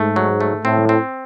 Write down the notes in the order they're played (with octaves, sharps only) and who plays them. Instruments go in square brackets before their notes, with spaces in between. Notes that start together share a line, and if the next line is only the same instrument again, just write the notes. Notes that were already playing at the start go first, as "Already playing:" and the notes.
Already playing: [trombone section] G#2 [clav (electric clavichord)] A3
[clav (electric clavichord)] F#3
A3
[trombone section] A2 [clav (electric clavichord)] C4
[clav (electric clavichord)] C4